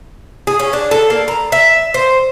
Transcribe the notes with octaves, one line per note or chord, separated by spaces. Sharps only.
G#4
C#4
D4
A4
A#3
A#5
E5
C5